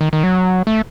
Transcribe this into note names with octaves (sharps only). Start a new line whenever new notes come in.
D#3
D#3
F#3
A3